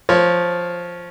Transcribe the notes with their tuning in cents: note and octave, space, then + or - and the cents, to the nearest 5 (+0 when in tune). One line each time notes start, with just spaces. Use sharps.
F3 +0 C#5 -10